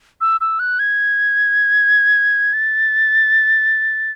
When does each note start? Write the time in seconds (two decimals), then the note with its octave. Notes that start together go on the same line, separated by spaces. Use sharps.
0.21 E6
0.41 E6
0.59 F#6
0.79 G#6
2.53 A6